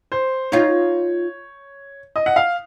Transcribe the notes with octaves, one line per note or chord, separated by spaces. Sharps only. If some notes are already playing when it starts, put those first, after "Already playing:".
C5
D#4 F4 C#5
D#5
F#5
F5